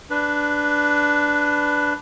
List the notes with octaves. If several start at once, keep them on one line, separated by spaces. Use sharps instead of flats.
D4 B4